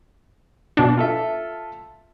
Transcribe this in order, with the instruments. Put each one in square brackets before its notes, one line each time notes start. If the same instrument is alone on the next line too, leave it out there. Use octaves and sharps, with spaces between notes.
[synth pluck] B2 D4
[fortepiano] F4 A4 E5